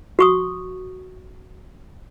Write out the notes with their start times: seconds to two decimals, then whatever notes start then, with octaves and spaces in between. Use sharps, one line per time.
0.19 F#4 C#6 D#6